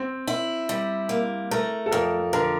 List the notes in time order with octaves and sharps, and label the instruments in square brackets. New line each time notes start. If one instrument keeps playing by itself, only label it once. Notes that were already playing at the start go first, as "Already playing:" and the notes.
Already playing: [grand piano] C4
[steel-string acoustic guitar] E4
G3
A#3
[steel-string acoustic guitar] A3 [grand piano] A#4
[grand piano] A4
[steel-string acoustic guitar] F2 [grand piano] A#4
[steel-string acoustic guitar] D3 [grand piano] A#4